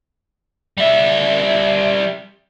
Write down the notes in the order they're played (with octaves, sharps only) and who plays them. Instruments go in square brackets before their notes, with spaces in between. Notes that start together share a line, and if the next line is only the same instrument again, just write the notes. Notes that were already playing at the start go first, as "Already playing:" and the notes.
[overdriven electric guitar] G3 E5